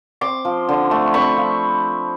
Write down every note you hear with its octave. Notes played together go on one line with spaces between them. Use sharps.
C4 C6 D6
F3
D3
A3
C4 B5 C#6
F3